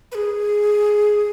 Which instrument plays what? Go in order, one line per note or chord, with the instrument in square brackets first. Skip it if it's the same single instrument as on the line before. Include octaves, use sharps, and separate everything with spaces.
[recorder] B4
G#4